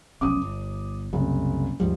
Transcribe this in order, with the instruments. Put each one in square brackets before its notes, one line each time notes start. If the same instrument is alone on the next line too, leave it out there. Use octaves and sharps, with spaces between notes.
[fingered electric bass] F1 B1 C#4 [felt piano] D6 D#6
[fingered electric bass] G1
[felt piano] F#1 [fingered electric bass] C2
[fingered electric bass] D#2 G#2 G3 [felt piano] F3